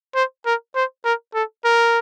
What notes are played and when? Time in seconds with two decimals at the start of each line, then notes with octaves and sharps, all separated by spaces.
0.15 C5
0.46 A#4
0.75 C5
1.05 A#4
1.34 A4
1.65 A#4